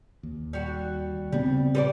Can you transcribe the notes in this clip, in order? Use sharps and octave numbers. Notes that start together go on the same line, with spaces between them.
D#2
G3 F#4
C#3 G3 B3 C4
G3 B4 D5